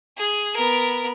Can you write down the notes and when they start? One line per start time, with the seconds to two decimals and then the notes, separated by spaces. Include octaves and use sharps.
0.17 G#4
0.56 B3 A#4